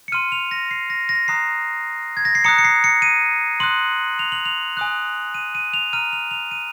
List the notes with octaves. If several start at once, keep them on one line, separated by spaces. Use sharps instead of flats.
C#7
C6 F6 D#7
F7
A#6
C7
A#6
A#6
A#5 D#6 F#6 C7
G#6
A#6
C7
A#5 D#6 F#6 C#7
C#7
C7
C#7
D#7
C6 D#6 F#6 F#7
F7
F#7
F7
G#5 D#6 F#6
D#7
D#7
F7
A#5 F6 D#7
F7
F7
D#7